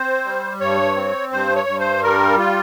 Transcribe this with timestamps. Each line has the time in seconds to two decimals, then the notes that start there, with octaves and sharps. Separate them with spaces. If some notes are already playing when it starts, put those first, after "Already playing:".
Already playing: C4 C5
0.25 G3
0.60 G2 C#5
0.96 C4
1.31 G2 C5
1.56 C#5
1.68 G2
1.79 C5
2.03 G3 A#4
2.38 F4